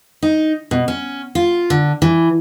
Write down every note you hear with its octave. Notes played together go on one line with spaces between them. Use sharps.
D#4
B2
C#4
F4
D3
E3